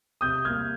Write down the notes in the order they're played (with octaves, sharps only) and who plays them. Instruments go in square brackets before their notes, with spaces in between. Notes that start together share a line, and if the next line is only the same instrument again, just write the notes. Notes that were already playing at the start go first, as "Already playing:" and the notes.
[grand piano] C3 D#6 G6
G3 A#3 F6 G#6